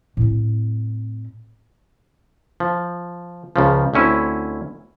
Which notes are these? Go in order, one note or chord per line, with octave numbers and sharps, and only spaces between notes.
A2 C4
F3
C#2 C#3 F3
D2 C4 C#4 E4